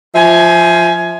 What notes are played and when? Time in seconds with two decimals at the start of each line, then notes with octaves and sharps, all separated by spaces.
0.15 F3 E5 G#5